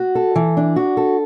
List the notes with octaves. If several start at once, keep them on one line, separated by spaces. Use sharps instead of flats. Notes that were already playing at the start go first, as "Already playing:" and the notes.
Already playing: F#4
A4
E3
D4
F#4
A4